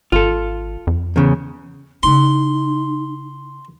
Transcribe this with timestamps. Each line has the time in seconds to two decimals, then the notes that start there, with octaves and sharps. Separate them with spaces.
0.12 G#1 F4 A4
0.87 F2
1.16 E2 C#3
2.03 C#3 D#4 E4 C6